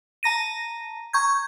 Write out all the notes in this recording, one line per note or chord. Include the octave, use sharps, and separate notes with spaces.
A5 A#5 A#6 D#7
A#5 C#6 G6 G#6